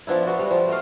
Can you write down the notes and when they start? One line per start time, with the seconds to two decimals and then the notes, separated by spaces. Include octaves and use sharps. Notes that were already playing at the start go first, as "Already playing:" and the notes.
0.07 F3 B3 D4 E4
0.26 B3 F#4
0.39 G3
0.51 F3
0.68 A3 D#5 F5